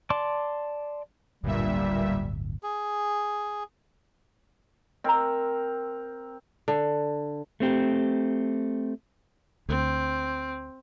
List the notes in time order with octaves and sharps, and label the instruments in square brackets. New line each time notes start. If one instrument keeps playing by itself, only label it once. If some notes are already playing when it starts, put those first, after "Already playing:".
[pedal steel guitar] D5 A5 C6 D6
[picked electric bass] D1 G1 [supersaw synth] G2 A#2 E5 [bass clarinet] G3
[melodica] G#4
[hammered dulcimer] C4 A#4 [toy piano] D#5 A#5
[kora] D3
[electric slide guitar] A3 C4 G4
[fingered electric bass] D2 [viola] C4